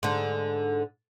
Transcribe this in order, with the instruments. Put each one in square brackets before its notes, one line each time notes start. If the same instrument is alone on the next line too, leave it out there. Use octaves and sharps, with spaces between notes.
[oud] G#2 D3